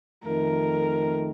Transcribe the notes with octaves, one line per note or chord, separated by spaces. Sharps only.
F2 D#3 A3 A#4